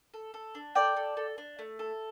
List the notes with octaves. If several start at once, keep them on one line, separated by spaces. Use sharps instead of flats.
A4
A4
D4
A4 D5 G5
A4
A4
D4
A3
A4